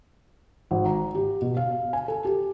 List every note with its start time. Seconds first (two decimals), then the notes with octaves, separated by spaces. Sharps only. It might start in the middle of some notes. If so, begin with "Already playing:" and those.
0.71 G#1
0.86 A#5
1.15 G4
1.42 B2
1.57 F5
1.93 G#5
2.08 A4
2.25 G4